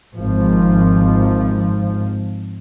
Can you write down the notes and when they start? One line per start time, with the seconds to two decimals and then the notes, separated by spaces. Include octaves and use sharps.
0.15 G#1 F3